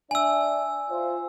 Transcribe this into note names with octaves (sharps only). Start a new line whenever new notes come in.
D4 D5 E5 G#5 E6
F4 C5